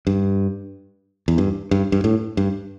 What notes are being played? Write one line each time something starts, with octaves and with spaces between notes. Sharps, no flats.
G2
E2
G2
G2
G2
A2
G2